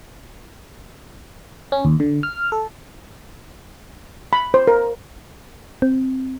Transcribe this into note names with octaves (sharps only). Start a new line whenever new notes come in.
C#4
D#2
D3
F6
A4
B5
C5
A#4
C4